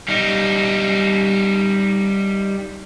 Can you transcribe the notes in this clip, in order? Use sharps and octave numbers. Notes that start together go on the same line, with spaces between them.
G3 D#4